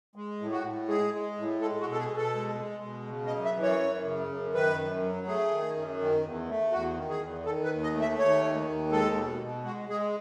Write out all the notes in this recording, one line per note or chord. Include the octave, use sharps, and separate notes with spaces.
G#3
A2
F#4
A2
G#3 G#4
G#3
A2
G#3 A4
F#4
B2
A4
G#4
B2
A4
G#3
G#3
B2
C#3
D#5
F#2
E5
E3
C#5
F#2
C#3
F#2
D#3 B4
F#2
F#3
A3 G#4
D#3
F#2
D#3
E2
A3
E2 F#4
D#3
G#4
E2
D#3 A4
B4
D#2
D#5
A3
E5
D#2 C#5
D#3
D#2
G#3 A4
B2
B2
G#3 F#4
G#3 G#4